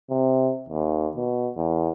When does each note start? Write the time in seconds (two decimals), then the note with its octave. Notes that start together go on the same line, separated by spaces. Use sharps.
0.10 C3
0.69 D#2
1.17 B2
1.57 E2